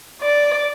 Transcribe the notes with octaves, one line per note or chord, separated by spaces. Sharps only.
D5